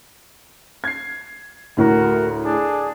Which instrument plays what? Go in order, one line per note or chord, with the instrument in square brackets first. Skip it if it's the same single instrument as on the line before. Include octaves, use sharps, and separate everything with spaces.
[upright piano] G#6 C7
[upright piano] D2 A2 [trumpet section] F#4 A#4
[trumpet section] D4 G#4